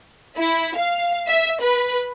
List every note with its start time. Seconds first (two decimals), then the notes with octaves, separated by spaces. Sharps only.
0.37 E4
0.76 F5
1.28 E5
1.61 B4